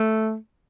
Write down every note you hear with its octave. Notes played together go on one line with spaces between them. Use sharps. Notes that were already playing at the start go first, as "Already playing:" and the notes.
Already playing: A3